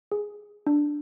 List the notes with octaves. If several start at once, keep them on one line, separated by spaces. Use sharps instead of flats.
G#4
D4